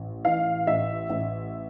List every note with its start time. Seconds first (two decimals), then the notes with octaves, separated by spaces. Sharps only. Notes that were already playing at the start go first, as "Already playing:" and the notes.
Already playing: A1
0.25 E3 F5
0.67 A1 E5
1.09 A1